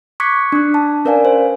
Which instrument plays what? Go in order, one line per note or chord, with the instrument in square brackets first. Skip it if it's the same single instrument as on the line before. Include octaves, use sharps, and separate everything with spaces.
[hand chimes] C#6 D6 F#6 G#6 B6 C#7
D4 F#6
A5
C#4 A#4 B4 D5 F5 G#5
C5